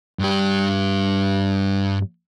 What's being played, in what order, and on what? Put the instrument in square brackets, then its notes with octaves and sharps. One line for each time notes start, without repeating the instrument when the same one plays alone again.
[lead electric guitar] G2 G4